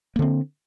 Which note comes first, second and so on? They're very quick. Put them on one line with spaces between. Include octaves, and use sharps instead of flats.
A#3 D3 C4